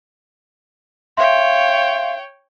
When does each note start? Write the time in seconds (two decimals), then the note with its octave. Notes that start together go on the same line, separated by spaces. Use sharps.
1.17 C#5 E5 F5 G5 C6